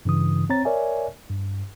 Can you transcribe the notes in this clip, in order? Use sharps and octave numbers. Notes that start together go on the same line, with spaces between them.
G2 C#3 E3 D#6
C4 C#5 A#5 A6
A#4 C#5 D5 E5 G#5
G2